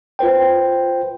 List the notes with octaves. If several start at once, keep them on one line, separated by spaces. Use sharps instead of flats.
F4 B4 C5 G5